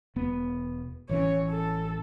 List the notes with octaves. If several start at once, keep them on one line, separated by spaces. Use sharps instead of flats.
E1 B3
A1 E3 C#4 C#5
A4